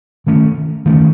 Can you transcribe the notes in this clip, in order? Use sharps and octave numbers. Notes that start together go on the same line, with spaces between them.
D#3 A3 C#4
D#3 A3 C#4